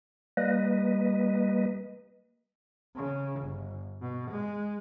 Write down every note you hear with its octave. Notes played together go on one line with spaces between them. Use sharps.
G3 A#3 B4 D#5
C#3
G1
B2
G#3